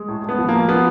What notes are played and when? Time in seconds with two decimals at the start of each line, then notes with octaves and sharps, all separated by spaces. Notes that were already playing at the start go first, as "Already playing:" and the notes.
Already playing: G#3
0.08 A2
0.24 A2
0.29 B3
0.39 F3
0.49 F3 A#3
0.69 F3 B3